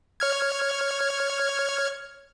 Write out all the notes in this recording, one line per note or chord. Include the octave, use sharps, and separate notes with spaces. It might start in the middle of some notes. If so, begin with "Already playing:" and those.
C#5 F6 G#6